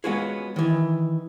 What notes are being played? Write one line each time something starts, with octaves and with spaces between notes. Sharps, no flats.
G#3 B3 C#4 F4 F#4 G#4
D#3 E3